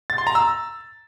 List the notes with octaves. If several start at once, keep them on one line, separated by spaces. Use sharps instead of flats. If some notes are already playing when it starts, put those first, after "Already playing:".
A6
C6
A#5
E6